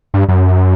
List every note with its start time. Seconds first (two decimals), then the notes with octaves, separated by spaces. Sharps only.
0.14 G2
0.28 F#2